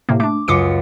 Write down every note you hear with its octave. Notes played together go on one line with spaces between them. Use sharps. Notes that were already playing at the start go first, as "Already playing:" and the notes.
A2 C3 A#3
A3 D4 D6
C#2 F#2 F4 D6 D#6 C#7